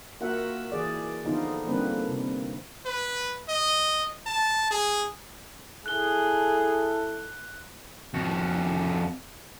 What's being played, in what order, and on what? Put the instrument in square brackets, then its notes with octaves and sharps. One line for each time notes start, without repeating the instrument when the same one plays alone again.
[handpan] A#3 F4 F#4 A#4 E5 F#5
E3 G#4 D5
D3 F3 B3 D#4 F4
D3 G3 A#3 C4 B4
C3
[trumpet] B4
D#5
A5
G#4
[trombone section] E4 A4 [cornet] G#4 [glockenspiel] F#6 G7
[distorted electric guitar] F2 F#4